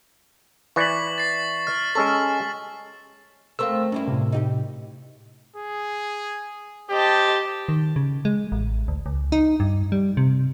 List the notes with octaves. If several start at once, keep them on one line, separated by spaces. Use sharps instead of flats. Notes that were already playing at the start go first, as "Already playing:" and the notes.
E3 B4 D5 C#6 B6 F#7
A6 C7
F6
G#3 C#4 A4 C#6
A3 C4 A#4 F5 C6 E6
G2 A#3 C#4 E4
A2 C3
D#4 F#4 G4
G#4
G4 C5 D#5 A5
D#3
C#3
G#3
A1
D2
C#2
D#4
G2
G3
C3